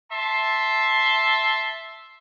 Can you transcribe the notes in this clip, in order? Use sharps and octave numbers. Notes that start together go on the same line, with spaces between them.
E5 A5 C6